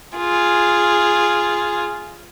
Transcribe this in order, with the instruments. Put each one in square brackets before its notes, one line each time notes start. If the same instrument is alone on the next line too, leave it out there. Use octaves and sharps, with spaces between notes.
[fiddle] F4 G#4